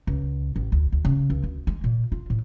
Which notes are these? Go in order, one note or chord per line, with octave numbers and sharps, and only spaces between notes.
C#2
A1
D2
D2
C#3
C#2
D2
G#3
A#2
F4
A2